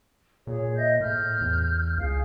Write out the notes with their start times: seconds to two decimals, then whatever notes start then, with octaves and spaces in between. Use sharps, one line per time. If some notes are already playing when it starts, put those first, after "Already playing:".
0.47 A#2 G#4 C#5
0.76 D#5 E5 G6
1.01 A2 F6 G6
1.41 E2
1.98 C#2 G#4 F5